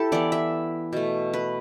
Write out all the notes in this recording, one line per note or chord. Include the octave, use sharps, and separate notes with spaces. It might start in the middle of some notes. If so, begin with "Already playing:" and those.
Already playing: E4 G4 A4
E3 B3 D5
E5
B2 A3
B4